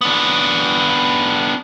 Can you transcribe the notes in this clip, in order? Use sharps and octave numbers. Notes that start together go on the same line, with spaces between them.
B3 D4